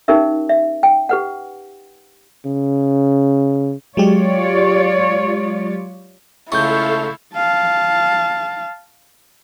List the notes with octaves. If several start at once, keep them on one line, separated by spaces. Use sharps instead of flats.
C#4 D#4 G4 A#4 E5
E5
G5
G4 B4 F#5
C#3
F#3 G#3 F4 G4 C#5 D5
C#2 A3 E4 A4 F5 C#6 G6
F5 A5